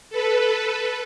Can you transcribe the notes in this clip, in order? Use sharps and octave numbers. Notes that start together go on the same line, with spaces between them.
A4 B4